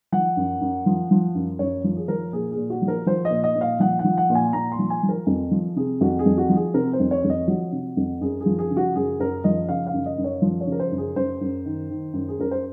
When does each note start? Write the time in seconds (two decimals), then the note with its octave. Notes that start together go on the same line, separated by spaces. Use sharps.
0.12 F3 F#5
0.37 F#2
0.61 F#2
0.86 F3
1.11 F3
1.35 F#2
1.59 F#2 C#5
1.84 F3
1.96 G#4
2.08 F3 A#4
2.33 A#2 G#4
2.51 G#4
2.57 A#2
2.70 F#4
2.82 F3
2.88 A#4
3.06 F3 C5
3.25 D#5
3.30 A#2
3.44 D#5
3.56 A#2
3.61 F5
3.80 F3 F#5
3.99 F#5
4.04 F3
4.17 F#5
4.30 A#2
4.35 G#5
4.53 A#2 A#5
4.72 C6
4.79 F3
4.90 G#5
5.03 F3
5.09 A#4
5.27 F2
5.51 F3
5.76 C3 G#4
6.01 F2 F#4
6.19 G#4
6.26 F2
6.38 F#4
6.49 F3
6.56 G#4
6.74 C3 A#4
6.93 C5
7.00 F2
7.11 C#5
7.24 F2
7.30 D#5
7.47 F3 F#4
7.72 C3
7.97 F2
8.21 F#2 G#4
8.40 G#4
8.46 F3
8.59 G#4
8.71 C#3
8.77 F#4
8.95 F#2 G#4
9.19 F#2 A#4
9.44 F3 D#5
9.69 C#3 F5
9.87 F5
9.93 F#2
10.06 D#5
10.18 F#2
10.24 C#5
10.42 F3
10.60 C#5
10.67 C#3
10.72 A#4
10.79 C5
10.92 F#2
10.98 G#4
11.16 F#2 C5
11.41 F#2
11.65 D#3
11.90 D#3
12.14 F#2
12.28 G#4
12.39 F#2 A#4
12.51 C5